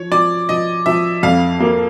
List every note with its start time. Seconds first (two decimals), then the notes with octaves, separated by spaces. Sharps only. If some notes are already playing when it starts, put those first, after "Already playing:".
Already playing: F3 C#5
0.12 F3 D5
0.49 F3 D#5
0.86 F3 E5
1.23 F2 F5
1.60 A#3